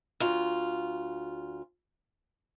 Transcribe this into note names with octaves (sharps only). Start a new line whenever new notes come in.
D2 F4